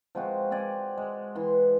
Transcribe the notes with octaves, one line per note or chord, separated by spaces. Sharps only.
F3 G#3 C4 F#4
C4 F#4 D5 G#5
G#3
E3 C6